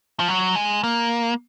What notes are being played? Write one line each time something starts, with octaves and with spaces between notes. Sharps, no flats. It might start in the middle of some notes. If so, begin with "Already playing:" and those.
F3
F#3
G#3
A#3